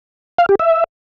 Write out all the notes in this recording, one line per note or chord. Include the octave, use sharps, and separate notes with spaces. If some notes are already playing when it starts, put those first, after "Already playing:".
F5
G4
E5